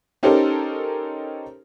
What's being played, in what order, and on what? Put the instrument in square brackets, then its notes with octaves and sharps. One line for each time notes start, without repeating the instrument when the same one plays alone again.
[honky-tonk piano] C#4 D#4 G4 A4 A#4 C5